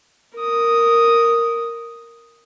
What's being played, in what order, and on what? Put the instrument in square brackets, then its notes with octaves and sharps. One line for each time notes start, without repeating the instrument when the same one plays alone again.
[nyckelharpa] A#4 D#6